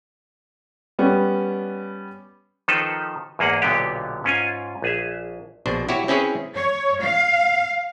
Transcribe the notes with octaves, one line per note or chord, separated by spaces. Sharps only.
G3 B3 C#4
D#3 F3 D#4 A4 B4 C5
E2 G#2 A#3 G#4 F#5
B1 A#2 D3 B3 G4
G#2 C#4 F4 G#5
A#1 G#4 E5
A#1 B2 D4 C5
E4 F#4 G4 C#5
C4 C#4 E4 G#4 B4 C#5
C#5
F5